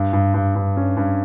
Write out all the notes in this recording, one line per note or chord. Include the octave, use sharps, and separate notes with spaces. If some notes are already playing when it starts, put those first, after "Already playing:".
Already playing: G2
G2
G2
G2
C#4
G2